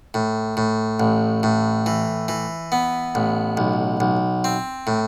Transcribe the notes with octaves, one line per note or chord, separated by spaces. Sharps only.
A2
A2
A1
A2
E3
E3
B3
A1
B1
B1
C4
A2